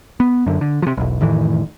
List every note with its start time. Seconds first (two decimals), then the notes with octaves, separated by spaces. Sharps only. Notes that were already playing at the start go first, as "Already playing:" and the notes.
0.20 B3
0.46 F#2 D3
0.61 D3
0.82 C3 F3
0.97 E1 B1
1.21 F1 A2 D#3 E3